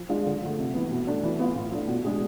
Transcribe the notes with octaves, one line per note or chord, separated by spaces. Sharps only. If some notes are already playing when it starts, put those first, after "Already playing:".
Already playing: F3
G#3 D4 F4
D3
F3 A3
C3
E3 B3
B2
A3 D4
E3
B3 F4
A2
F3 A3 D4
B2
G#3 D4 G#4